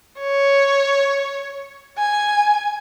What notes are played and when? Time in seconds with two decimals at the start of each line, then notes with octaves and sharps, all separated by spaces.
0.20 C#5
1.98 G#5